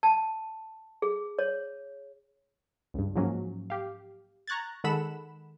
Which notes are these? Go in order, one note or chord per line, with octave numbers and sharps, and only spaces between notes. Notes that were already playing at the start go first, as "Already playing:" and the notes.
A5
G#4
C#5
C#2 G2
G#2 F3 F#3 A#3 C#4
G4 F5
A#5 C#6 F#6 G#6 A6
D#3 G#3 A4 F#5 B5 E7